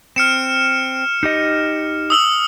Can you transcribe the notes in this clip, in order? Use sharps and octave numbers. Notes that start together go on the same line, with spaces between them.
C4 F6 C#7 E7
D#4 G4 D#5
D#6 E6 F#7